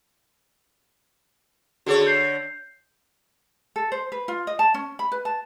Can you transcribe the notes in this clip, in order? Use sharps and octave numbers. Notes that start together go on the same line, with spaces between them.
D3 F#4 G#4 A4 C#5
G6 C7
A4
C5
B4
F4
D#5
A5
C#4
B5
B4
A5